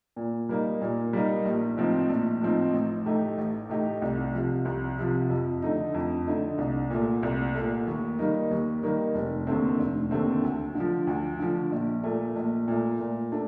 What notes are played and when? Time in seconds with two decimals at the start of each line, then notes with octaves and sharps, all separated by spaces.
0.16 A#2
0.49 G3 A#3 D#4
0.81 A#2
1.13 G3 A#3 D#4
1.45 A#1
1.78 A2 F3 C4 D#4
2.09 A#1
2.41 A2 F3 C4 D#4
2.74 A1
3.06 A2 A3 D#4 G4
3.38 A1
3.69 A2 A3 D#4 G4
4.02 C2
4.34 C3 F3
4.65 C2
4.98 C3 F3
5.30 F2
5.62 D3 A3 D#4
5.94 F2
6.27 D3 A3 D#4
6.58 C2
6.90 A#2 A3
7.23 C2
7.55 A#2 A3
7.87 D#2
8.19 D#3 G3 A#3 D#4
8.51 D#2
8.83 D#3 G3 A#3 D#4
9.15 F1
9.47 D#2 D3 A3 C4
9.78 F1
10.11 D#2 D3 A3 C4
10.43 D2
10.75 D3
10.80 F3
11.07 D2
11.40 D3 F3
11.72 A#1
12.04 A#2 A3
12.35 A#1
12.68 A#2 A3
13.00 A#2
13.32 A3 D4